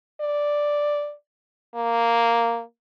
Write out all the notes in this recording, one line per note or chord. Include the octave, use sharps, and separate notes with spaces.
D5
A#3